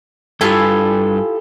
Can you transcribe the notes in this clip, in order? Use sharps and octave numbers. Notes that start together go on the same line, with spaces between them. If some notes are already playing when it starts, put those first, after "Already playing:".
G2 E4 F4 G4 A4 G#5